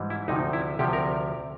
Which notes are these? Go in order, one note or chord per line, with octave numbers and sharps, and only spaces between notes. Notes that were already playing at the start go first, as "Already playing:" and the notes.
Already playing: G#2 E3 G3
E4
D2 C3 F3 D#4
E4
D2 C3 F3 G4
A#4